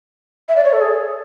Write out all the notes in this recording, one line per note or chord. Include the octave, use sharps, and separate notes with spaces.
E5
D5
C#5
A4
G#4